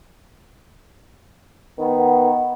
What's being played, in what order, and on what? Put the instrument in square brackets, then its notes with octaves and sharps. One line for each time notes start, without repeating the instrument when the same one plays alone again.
[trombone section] D#3 B3